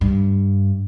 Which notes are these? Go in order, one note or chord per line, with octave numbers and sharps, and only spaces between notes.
G2